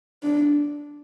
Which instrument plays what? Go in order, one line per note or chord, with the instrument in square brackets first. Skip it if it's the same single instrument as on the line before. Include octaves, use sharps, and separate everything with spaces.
[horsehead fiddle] D4